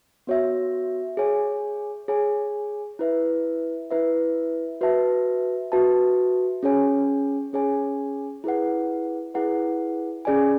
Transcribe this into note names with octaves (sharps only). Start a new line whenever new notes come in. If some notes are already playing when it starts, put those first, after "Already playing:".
B3 F#4 C#5 E5
G#4 C#5 G#5
G#4 C#5 G#5
E4 B4 E5
E4 B4 E5
F#4 B4 E5 A5
F#4 B4 E5 A5
C#4 G#4 C#5 G#5
C#4 G#4 C#5 G#5
E4 G#4 B4 F#5
E4 G#4 B4 F#5
C#4 G#4 D5 G#5